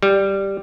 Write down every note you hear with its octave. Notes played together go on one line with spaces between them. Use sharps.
G3